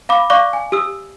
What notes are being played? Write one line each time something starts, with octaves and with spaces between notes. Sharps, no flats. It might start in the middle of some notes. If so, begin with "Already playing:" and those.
F5 B5 D6
D5 F5 C#6 D6 F#6 G7
G#5
G4 D#6 E6